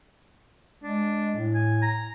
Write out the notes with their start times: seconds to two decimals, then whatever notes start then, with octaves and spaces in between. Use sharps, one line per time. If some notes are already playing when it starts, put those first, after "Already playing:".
0.83 G#3 D4
1.35 A2
1.55 G#5
1.82 A#5